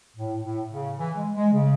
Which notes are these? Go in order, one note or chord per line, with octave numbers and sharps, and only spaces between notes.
A2
A2
C#3
E3
G#3
G#3
C#3